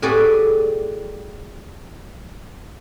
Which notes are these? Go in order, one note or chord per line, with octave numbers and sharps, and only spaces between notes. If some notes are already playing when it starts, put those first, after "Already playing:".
A2 G3 F#4 G#4 B4 D5